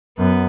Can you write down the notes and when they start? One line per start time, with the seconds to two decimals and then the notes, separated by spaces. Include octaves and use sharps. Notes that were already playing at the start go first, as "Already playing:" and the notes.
0.18 F#2 B3